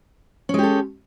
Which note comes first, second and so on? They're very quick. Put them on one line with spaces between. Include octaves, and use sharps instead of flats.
C#4 G#3 G4 A4